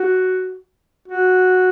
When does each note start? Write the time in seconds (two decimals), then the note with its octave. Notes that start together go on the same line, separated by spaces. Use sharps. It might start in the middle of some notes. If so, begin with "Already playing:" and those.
Already playing: F#4
1.08 F#4